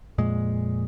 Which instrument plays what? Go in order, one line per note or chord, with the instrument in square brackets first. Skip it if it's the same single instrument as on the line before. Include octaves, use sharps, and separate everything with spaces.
[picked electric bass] F2 A#2 G#3